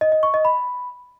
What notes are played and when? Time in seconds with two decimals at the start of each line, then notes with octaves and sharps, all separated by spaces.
0.01 D#5
0.12 D#5
0.23 C#6
0.34 D#5
0.45 B5